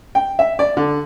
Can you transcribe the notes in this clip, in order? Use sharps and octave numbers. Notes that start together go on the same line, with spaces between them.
G5
E5
D5
D3